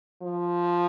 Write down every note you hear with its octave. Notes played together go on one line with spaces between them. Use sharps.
F3